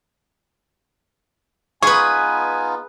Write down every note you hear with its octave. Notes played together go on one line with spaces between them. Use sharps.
B3 D#4 F4 G#4 B4 G#5 C#6